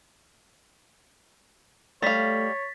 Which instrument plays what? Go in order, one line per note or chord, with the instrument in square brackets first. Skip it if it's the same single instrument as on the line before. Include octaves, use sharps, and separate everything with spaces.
[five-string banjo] G3 F5 [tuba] A3 [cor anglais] C#5 [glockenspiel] A6 B6